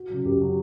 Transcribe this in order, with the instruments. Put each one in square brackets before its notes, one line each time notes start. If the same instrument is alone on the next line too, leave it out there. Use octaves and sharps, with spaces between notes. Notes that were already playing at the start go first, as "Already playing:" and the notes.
Already playing: [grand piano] F#4
C#3 F#3
F#2 G4
C#3 F#3